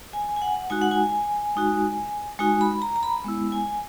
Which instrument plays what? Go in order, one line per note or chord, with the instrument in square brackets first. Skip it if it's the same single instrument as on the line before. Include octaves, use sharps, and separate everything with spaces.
[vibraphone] G#5
G#5
F#5
G#3 D#4 F#4 G#5
F#5
G#5
G#3 D#4 F#4
G#3 D#4 F#4 G#5
B5
A#5
A#5
B5
G#3 B3 E4
G#5